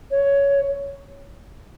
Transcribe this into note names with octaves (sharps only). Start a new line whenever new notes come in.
C#5